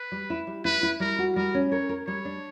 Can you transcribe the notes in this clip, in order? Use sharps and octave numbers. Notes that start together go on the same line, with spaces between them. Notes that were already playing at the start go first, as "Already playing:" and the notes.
Already playing: B4
G3
E4
G3
E4 B4
E4
G3 A#4
F#4
G3 A#4
C#4
A#4 C#5
A#4
G3 C#5
D4